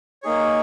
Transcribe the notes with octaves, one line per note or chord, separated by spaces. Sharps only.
A#3 D#4 G#4 C#5